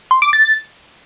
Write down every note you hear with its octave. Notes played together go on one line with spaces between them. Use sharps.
C6
D6
A6